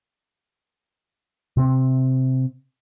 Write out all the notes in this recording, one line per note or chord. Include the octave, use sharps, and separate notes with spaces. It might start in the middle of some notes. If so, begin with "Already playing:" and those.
C3 C4